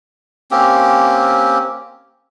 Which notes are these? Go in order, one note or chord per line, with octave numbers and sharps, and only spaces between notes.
A#3 C4 C#4 G4